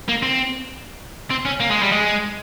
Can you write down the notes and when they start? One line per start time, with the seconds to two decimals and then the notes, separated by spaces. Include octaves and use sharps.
0.08 A#3
0.23 C4
1.31 C4
1.45 C#4
1.60 A#3
1.71 G#3
1.82 G3
1.92 G#3